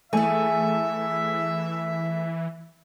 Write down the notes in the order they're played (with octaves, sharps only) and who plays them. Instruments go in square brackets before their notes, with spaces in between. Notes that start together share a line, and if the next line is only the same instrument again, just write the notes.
[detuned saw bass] E3 [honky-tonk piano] A3 [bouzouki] G#4 A4 [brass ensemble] E5